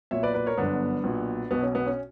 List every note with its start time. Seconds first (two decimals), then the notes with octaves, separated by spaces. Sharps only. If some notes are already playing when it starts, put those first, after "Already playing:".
0.11 B1 A#2 C#5 E5
0.23 B4 D5
0.34 B4 D5
0.46 A#4 C#5
0.57 G1 F#2 D3 B3 D4
1.04 B1 A#2
1.51 B1 B2 B3
1.63 C#4
1.75 B3
1.86 C#4